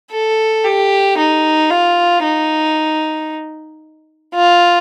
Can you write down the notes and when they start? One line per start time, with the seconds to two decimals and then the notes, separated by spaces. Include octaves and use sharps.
0.12 A4
0.65 G4
1.18 D#4
1.70 F4
2.23 D#4
4.35 F4